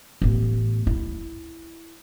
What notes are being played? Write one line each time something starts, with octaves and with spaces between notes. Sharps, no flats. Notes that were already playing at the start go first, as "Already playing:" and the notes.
A1 B3
E4